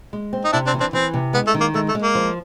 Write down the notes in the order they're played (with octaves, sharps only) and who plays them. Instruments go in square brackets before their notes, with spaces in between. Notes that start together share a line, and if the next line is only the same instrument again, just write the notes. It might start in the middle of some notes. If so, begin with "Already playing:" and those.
[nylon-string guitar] G#3
C4
[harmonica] D#4
[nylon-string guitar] C3 [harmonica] D4 E4
[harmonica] C4 D4
[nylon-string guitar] E3
[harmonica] C4 D4
[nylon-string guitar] E3 [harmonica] C4
[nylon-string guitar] C3
[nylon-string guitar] G#3 [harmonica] B3
[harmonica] A3
[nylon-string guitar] D#3
[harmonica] A#3
[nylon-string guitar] G#3 [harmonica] A3
[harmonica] A3
[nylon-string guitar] G#3
[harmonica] A#3
[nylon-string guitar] F3